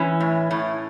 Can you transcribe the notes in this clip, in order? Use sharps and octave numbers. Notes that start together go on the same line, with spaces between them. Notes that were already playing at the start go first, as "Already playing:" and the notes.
Already playing: E3 C#4
A2
A2